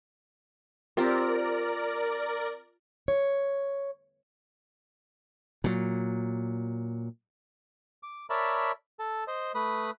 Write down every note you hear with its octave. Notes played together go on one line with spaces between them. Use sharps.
C4 F4 G4 A#4 D5
C#5
A#2 F#3
D6
A#4 C#5 D5 E5 A5 B5
A4 A5
C5 D#5
A3 B4 B5 D#6